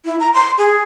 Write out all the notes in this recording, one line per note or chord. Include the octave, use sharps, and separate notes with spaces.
E4
A#5
C6
G#4